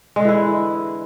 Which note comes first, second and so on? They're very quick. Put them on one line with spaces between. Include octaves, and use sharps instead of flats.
G#3 D3 E3 E4